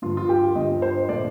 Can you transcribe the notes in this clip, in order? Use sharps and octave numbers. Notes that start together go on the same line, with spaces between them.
G2 D3 F3 F4
F4
G4
G2 D3 F3 D#5
C5
A#2 F3 A3 D5